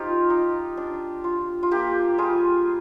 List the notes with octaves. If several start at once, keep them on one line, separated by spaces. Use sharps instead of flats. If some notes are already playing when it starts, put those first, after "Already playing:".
Already playing: F3 D#4 F4 G4
D#4
D4
F4
F4
A#3 G4
G3 F4 G#4